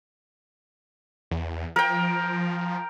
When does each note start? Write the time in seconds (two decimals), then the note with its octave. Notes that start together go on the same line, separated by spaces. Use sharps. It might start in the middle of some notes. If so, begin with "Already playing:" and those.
1.31 E2
1.76 F3 A#4 G5